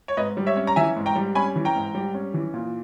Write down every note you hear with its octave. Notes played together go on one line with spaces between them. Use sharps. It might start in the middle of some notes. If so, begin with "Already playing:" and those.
C#5
G#2 B4 D#5
G3
C#5 E5
C#4
A#5
E3 E5 G#5
G#2
G5 A#5
G3
C#4 G#5 B5
E3
G5 A#5
G#2
G3
C#4
E3
A#2